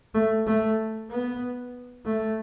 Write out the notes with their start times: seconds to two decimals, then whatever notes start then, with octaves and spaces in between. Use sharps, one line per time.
0.14 A3
0.47 A3
1.10 B3
2.05 A3